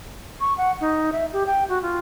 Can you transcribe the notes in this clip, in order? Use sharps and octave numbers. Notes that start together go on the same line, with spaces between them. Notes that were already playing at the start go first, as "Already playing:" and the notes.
C#6
F#5
D#4
E5
G4
G5
F#4
F4